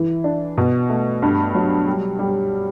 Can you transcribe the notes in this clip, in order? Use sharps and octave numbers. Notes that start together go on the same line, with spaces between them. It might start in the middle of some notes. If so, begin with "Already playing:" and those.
Already playing: E3
D4
B2
A3
G2
F#3
G3
G3